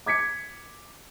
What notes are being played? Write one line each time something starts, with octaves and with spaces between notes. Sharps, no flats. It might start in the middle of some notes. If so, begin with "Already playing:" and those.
D6 G#6 B6 C#7